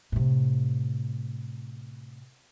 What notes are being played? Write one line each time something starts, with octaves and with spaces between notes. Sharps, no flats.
A2 C3